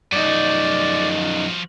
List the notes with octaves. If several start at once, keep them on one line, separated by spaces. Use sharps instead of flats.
F#2 F3 D#4 F#4 D5